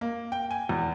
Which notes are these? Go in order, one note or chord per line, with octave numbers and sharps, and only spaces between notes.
A#3
G5
G#5
E2